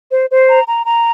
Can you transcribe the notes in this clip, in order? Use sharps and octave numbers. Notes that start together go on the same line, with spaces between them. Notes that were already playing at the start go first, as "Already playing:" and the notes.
C5
C5
A#5
A#5
A#5